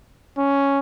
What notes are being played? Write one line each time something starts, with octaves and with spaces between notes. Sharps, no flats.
C#4